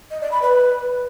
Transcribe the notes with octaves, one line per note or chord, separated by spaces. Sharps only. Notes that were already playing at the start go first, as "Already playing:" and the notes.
D#5
D5
B5
B4